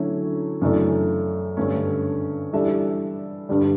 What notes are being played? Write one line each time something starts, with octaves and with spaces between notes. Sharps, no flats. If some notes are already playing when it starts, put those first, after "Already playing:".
Already playing: D3 F#3 A3 C#4 E4
F#2 C#3 E3 A3 D4
G2 D3 A3 C#4
E3 G3 D4 A4 E5
G2 D3 G3